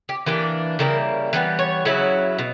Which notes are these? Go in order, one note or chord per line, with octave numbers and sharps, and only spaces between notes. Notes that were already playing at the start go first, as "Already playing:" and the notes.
G4
E3 A#3 D4 G4
C#3 G3 A#3 E4 A#4
E3 G3 B3 B4
C#5
C#3 F#3 C#4 E4
B2